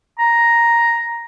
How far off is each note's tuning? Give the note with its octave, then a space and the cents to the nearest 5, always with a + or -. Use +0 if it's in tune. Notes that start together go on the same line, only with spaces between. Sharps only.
A#5 +5